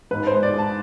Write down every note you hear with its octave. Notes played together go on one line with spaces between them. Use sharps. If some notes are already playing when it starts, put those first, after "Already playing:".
G#2 B4
C5
G#3
D5
G#3
A5